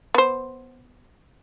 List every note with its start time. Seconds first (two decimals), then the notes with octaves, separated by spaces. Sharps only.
0.14 B3 C5